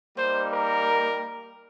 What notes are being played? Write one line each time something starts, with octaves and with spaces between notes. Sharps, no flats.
G3 A#3 D#4 C5
A#4